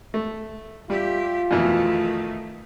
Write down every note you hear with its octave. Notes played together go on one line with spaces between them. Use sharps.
A3
G3 F4 G4 E5
F2 B2 D#3 E3 A3